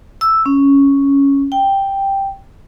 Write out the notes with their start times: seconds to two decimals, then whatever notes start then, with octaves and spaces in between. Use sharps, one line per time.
0.21 E6
0.46 C#4
1.52 G5